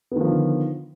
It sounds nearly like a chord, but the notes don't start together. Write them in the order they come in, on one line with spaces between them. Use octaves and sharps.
B3 D#3 F3 D3